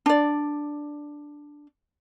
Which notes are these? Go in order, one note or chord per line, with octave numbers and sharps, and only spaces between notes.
D4 D5